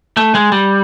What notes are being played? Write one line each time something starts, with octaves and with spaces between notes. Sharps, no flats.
A3
G#3
G3